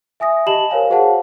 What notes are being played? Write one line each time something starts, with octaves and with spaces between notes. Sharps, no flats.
E5 G#5 D#6 A#6
G4 D#5 A5 B5 E7 F#7
A#4 C5 C#5 F5 G#5
F#4 G#4 C5 F5 F#5 A5